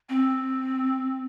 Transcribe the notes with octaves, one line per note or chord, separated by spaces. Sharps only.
C4